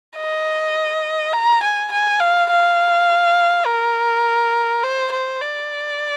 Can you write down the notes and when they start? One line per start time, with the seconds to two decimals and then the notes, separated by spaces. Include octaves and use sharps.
0.17 D#5
1.33 A#5
1.63 G#5
1.92 G#5
2.20 F5
2.50 F5
3.66 A#4
4.83 C5
5.12 C5
5.41 D5